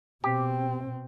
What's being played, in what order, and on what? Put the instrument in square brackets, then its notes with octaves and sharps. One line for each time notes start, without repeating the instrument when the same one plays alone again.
[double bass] B2 C4 [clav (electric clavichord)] G4